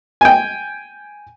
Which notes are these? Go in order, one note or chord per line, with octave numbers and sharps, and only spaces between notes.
G5 G#5